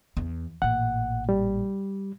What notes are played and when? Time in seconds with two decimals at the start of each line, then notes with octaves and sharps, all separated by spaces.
0.17 E2
0.62 A1 A#2 F#5
1.29 G3